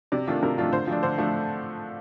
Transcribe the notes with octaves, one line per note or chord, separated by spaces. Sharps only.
C3 D5
D#3 A3 D4 F4
C3 A#4
D#3 A3 D4 F4
D3 C5
F3 A3 D4
D3 C5
F3 A3 D4